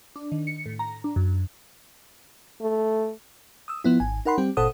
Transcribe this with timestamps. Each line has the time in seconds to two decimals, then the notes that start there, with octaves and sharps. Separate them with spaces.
0.16 D4
0.32 D#3
0.47 C#7
0.66 A2
0.79 A#5
1.04 D4
1.16 F#2
2.61 A3
3.68 D#6 E6
3.84 F3 B3 E4
4.00 G#1 G#5
4.25 D#4 A#4 F#5 B5 C6
4.38 G3 C4 G4
4.57 G1 A#2 A4 C5 F#5 D#6